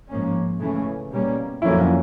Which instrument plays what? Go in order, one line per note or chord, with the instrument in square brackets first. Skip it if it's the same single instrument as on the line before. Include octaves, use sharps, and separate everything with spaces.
[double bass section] G#2 F3 A#3 C#4
C#3 E3 A3 C#4
B2 G3 A#3 C#4
[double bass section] F2 D3 F#3 A#3 C#4 [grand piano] E4
[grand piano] F4